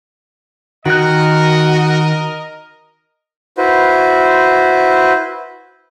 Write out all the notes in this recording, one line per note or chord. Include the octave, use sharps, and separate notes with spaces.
D#3 F#4 A#4 D#5 F#6
E4 F#4 B4 C5